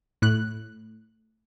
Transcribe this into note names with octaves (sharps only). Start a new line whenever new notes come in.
A2 F#6